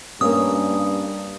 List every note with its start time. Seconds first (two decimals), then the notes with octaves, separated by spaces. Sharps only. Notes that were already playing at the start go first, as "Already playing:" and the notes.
0.21 G2 A#3 C#4 D#6